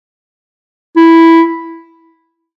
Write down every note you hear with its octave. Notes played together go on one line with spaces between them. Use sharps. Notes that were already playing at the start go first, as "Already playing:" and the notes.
E4